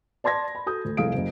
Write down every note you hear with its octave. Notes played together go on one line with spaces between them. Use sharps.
D5 A5 C6 G#6 A#6
B5
F#4 A4 D#6 G6
D2
F1 C2 G#4 F5 D#6 D7
F#1 F#2